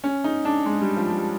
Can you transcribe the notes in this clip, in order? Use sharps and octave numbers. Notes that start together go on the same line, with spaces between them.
C#4
D#4
D4
G#3
G3
F3
G3